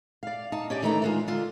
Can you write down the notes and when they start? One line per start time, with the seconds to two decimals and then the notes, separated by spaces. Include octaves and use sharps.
0.23 D5 F5
0.52 D#4 A5
0.70 C#4 G4 D5
0.82 D#3 E3 A3 D4 G5 A#5
1.02 D#3 G#3 F4
1.28 D3 F4